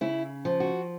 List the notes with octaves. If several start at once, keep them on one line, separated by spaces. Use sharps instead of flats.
C#3 E4
F3
F#4